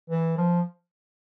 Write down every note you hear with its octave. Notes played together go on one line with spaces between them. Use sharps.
E3
F3